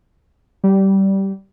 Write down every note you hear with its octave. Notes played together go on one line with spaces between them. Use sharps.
G3